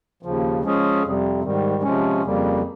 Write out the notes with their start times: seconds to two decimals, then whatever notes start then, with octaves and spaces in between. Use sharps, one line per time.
0.23 D#2 C#3 F3
0.63 F3 G#3 C#4 G#4
1.02 F2 C3 G3
1.43 G#2 D#3 G3
1.83 C3 F3 G#3 C#4
2.23 F2 C#3 G3 A#3